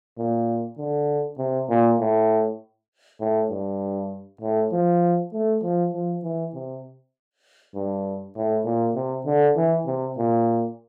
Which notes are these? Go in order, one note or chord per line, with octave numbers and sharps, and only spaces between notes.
A#2
D3
C3
A#2
A2
A2
G2
A2
F3
A3
F3
F3
E3
C3
G2
A2
A#2
C3
D3
E3
C3
A#2